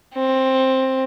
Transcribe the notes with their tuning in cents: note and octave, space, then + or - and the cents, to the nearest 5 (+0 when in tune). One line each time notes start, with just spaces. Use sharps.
C4 +10